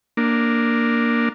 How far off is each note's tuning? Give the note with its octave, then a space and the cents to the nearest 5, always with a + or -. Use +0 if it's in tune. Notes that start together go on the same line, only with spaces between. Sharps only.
A#3 +0 D4 +0